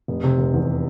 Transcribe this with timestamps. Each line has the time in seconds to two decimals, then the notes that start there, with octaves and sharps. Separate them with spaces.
0.08 F1
0.24 C3
0.38 F1
0.53 E2